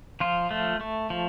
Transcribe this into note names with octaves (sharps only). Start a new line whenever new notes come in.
F3 F4
A3
A3
F3